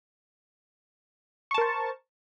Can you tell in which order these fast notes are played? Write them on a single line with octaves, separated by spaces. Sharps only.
C#6 A5 A#4 C5